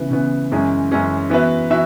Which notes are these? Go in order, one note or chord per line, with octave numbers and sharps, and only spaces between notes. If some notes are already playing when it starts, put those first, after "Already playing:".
Already playing: C#3 E3 B3
C#3 E3 B3
F#2 E3 G#3 C#4 G#4
F#2 E3 G#3 C#4 G#4
E3 B3 F#4 B4 E5
E3 F#4 E5